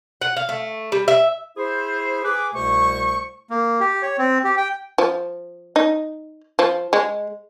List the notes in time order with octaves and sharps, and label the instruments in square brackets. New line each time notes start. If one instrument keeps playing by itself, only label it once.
[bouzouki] F#5
F5
A3
G3
E5
[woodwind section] E4 G#4 C5
G#4 B4 D6
C2 B2 A3 C5 C#6
[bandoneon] A#3
G4
C#5
C4
G4
G5
[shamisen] F3
D#4
F3
G#3